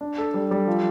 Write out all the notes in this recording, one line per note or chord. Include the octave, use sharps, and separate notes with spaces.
D4
A4
G3
G3
F3